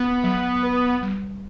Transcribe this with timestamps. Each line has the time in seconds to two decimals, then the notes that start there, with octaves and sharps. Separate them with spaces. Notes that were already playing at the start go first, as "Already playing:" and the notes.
Already playing: B3
0.24 F#3
0.63 B4
1.02 G3